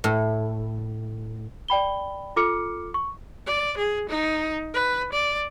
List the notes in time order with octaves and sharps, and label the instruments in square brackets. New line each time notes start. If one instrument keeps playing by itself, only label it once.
[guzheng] A2
[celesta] D5 G5 B5 G7
F4 A4 D6 F6 C#7
C#6
[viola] D5
G#4
D#4
B4
D5